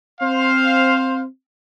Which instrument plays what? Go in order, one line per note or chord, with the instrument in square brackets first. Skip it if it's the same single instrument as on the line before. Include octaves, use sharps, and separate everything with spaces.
[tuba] C4 [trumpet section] C5 F5